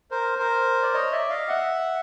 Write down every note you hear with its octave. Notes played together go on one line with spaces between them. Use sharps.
A#4 C5
A#4 C5
D5
C#5 D#5
D5 E5
D#5 F5
E5 F#5